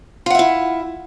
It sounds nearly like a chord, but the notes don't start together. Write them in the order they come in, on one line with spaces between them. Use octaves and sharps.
F4 F#5 E5 E4